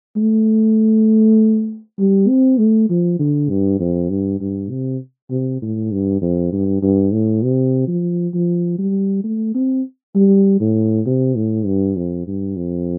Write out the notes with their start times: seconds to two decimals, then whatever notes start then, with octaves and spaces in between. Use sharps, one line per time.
0.16 A3
1.99 G3
2.28 C4
2.59 A3
2.90 F3
3.19 D3
3.49 G2
3.80 F2
4.10 G2
4.40 G2
4.70 C3
5.30 C3
5.62 A2
5.92 G2
6.22 F2
6.52 G2
6.83 G2
7.13 A2
7.43 C3
7.88 F3
8.34 F3
8.78 G3
9.24 A3
9.55 C4
10.15 G3
10.60 A2
11.06 C3
11.36 A2
11.66 G2
11.96 F2
12.27 G2
12.56 F2